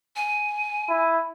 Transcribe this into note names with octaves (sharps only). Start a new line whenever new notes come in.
G#5
E4